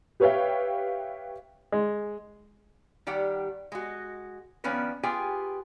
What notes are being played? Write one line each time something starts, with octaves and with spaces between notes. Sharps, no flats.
G4 B4 C#5 E5 F5 G5
G#3
D#3 G3 G4 F#5
G#3 F#4
D#3 F3 B3 C#4 D4 B4
B3 F4 G4 G#4 G5 G#5